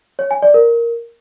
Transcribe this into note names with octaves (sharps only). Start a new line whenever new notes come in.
C#5
G#5
D5
A#4